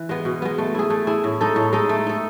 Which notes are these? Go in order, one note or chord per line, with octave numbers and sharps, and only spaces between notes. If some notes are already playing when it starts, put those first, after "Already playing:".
Already playing: E3
G#3 B3
B2
G#3 B3
A3
E4 G#4
A3
E4 G#4
A2
G#3 D#4 A4
A2
G#3 D#4 A4
A3
D#4 A4